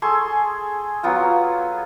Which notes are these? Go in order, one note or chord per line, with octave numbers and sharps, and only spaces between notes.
G#4 A4 C6 C#6
F#3 B3 F4